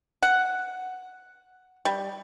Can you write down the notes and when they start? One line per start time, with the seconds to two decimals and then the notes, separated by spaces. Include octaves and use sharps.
0.22 F#5
1.85 G3